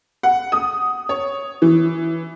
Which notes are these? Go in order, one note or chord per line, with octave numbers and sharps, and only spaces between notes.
F#5
D#6
C#5
E3